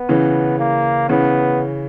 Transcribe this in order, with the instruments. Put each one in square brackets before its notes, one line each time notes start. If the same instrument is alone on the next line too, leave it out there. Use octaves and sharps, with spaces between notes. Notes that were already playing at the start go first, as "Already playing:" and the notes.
Already playing: [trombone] B3
[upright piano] C#3 E3
[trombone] A#3
[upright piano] C#3 E3 [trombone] B3